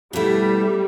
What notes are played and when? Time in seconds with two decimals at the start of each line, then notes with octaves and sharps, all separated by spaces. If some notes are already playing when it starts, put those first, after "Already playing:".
0.13 B2 G3 A3 E4